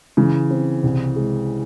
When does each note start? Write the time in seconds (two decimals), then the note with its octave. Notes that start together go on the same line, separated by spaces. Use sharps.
0.17 C#3 E3
0.51 C4
0.83 C2
1.16 G#3